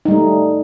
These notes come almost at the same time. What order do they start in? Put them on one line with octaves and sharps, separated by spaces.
D#4 G3 A3